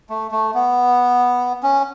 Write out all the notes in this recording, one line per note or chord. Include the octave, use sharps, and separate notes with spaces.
A3
A3
B3
C#4